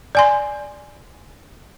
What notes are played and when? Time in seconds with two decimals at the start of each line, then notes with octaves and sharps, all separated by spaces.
0.15 D5 G#5 C6